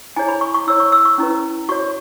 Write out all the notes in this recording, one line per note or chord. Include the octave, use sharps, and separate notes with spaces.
E4 G#4 C#5 G#5
B5
C#6
C#6
E4 C#5 E6
C#6
E6
C#6
C#4 E4 B4
F#4 C#5 C#6